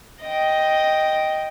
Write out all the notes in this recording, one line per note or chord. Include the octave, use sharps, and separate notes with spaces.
D#5 G5